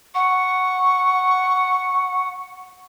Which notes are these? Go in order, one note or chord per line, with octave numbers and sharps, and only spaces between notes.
F#5 C#6